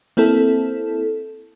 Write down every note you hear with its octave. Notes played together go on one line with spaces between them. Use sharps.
A#3 C4 E4 A4